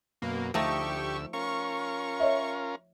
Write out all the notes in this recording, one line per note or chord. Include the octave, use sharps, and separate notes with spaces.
F#2 B2 A#3
D2 F3 A3 D#4 G4 C#6 E6
C#4 F4 A#4 C#6
C#5 D#5 E5